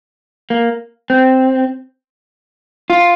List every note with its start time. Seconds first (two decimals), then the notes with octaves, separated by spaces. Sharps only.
0.50 A#3
1.10 C4
2.90 F4